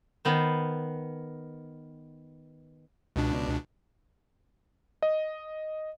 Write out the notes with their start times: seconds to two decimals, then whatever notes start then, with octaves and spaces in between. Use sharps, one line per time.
0.25 D#3 B3 C5
3.16 C#2 B2 D4
5.03 D#5